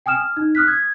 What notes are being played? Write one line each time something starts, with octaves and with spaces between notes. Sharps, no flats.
G5 G#5 D#6 F6 E7
F6
D#4
D#6 F6 F#6 B6
G#6